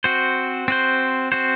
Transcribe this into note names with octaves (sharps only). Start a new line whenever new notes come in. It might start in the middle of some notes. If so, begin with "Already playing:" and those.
C4 F#4 C5
C4 F#4 C5
C4 F#4 C5